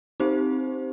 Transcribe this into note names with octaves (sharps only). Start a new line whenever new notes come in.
C4 D#4 G4 C5